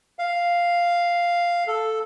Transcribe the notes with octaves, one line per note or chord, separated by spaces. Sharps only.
F5
A4